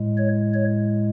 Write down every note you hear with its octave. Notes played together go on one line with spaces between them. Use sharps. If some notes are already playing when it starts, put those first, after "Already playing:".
Already playing: A2 G#3
C#5
C#5